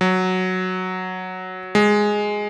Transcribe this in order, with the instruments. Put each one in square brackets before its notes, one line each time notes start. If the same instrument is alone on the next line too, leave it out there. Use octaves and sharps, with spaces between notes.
[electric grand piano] F#3
G#3